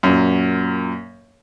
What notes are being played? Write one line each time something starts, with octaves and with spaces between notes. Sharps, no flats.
F#2 A#2